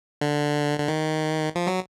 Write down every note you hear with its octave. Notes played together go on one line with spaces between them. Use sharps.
D3
D3
D#3
F3
F#3